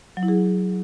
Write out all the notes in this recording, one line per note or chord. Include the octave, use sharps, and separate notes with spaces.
F#3
E4
G#4